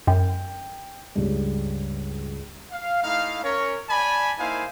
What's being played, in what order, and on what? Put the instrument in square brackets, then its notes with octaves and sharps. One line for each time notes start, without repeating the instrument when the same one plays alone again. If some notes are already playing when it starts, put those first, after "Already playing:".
[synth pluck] F#2 [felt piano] G5
[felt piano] C#2 G2
[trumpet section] F5
A3 D#4 E4 F5
C#4 A#4 C#5
D5 G#5 A5 B5
A#3 D#4 E4 C5 F5 G#5